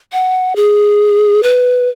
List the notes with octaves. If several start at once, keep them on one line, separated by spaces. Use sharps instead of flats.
F#5
G#4
B4